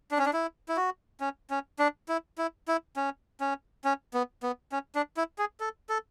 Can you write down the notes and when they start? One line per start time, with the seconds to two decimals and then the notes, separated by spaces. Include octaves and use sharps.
0.11 D4
0.18 C#4
0.26 D4
0.33 E4
0.69 E4
0.77 F#4
1.20 C#4
1.50 C#4
1.79 D4
2.09 E4
2.38 E4
2.68 E4
2.96 C#4
3.40 C#4
3.85 C#4
4.14 B3
4.43 B3
4.72 C#4
4.95 D4
5.17 E4
5.38 G#4
5.60 A4
5.89 A4